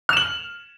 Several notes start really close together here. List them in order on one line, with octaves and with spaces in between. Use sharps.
F6 E7 F#7